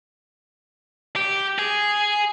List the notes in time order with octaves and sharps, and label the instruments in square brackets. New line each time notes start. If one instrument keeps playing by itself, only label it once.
[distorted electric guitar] G4
G#4